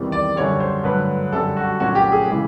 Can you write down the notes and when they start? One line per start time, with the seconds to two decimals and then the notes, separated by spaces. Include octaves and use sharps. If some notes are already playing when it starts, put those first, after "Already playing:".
Already playing: E2 C3 D#3 G3
0.12 D5
0.36 F#2 D3 G3 C#5
0.60 C5
0.84 G2 D3 F#3 A3 B4
1.32 F#2 D3 G3 A4
1.57 F#4
1.80 A#2 F#3 A3 C#4 F#4
1.95 G4
2.12 G#4
2.28 C#3 E3 G#3